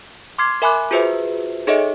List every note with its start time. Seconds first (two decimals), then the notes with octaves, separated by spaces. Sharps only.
0.38 C6 D6 F6 G#6 C7
0.62 A#4 E5 G#5 B5 D6 F#6
0.91 F4 F#4 G#4 B4 C5 E5
1.67 D#4 G#4 A4 C#5 D#5 E5